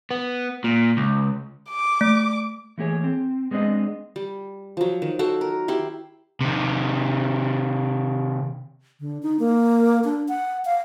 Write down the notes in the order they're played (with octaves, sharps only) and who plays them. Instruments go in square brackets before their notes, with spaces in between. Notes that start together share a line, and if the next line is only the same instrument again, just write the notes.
[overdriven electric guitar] B3
A#2
C#2
[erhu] D6
[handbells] A3
[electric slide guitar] E3 A3 A#3 G#4 C#5
C4
G#3 B3 C4 D4 D#5
[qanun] G3
F3 F#3
D#3
F#4 A4 C5
A#4
E4 G4 C6
[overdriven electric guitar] C3 D#3
[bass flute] D3
D#4
A#3
D4
F#5
F5